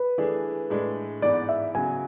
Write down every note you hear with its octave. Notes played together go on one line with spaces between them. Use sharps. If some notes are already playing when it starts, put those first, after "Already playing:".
Already playing: B4
E3 A3 D4 G#4
A2 G#3 D4
G#2 E3 B3 D5
E5
C#3 F#3 B3 G#5